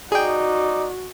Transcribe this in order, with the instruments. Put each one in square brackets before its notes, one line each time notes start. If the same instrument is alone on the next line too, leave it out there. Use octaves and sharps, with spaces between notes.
[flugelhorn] D#4 [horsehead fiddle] F#4 [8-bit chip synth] G#4 G5 [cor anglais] D5